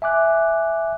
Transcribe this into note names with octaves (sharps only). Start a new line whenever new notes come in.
E5 G#5 D6 F#6